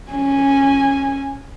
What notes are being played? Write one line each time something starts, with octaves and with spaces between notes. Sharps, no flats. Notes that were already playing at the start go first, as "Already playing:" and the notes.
C#4 G#5